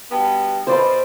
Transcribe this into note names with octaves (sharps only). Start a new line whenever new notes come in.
G2 B2 B3
B2 C5 D5 B5